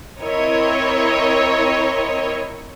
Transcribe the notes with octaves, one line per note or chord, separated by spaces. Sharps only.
C4 E4 A#4 C#5 D#5